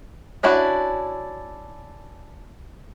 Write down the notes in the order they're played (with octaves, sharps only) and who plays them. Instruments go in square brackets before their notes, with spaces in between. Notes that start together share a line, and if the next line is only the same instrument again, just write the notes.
[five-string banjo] C#4 D4 E4 F#4